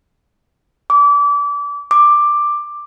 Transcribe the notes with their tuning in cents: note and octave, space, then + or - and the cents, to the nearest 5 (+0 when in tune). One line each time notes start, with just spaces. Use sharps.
D6 -30
D6 +10